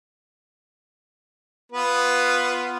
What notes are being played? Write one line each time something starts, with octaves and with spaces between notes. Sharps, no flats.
B3 F4 B4